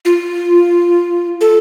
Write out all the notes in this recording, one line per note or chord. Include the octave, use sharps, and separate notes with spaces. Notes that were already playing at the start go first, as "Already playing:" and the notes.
F4
A4